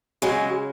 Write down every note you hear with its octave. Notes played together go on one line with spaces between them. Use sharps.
C#3 F#3 G#3